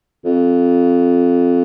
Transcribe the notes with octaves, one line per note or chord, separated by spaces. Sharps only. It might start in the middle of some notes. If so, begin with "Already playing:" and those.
F2